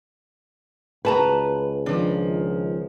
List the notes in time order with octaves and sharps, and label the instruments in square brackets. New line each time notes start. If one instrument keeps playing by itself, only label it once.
[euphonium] C#2 [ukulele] F#4 A5 A#5 [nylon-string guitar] B4
[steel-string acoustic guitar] D#3 F3 [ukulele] D4